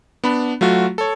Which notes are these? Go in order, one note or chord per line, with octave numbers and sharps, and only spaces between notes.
B3 D4 B5
F#3 A3 F4 F#4
A4 C#5